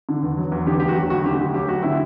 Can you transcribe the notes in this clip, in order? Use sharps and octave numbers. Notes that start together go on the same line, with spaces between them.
D3
E2
F#3
E2
D3 G4
D2 G4
F#4
F#3
D2 F#4
D3 G4
D2
F#3 G4
D2 F#4
D3 E4